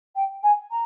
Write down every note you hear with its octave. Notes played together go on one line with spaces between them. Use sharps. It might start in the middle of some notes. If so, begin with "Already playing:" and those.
G5
G#5
A#5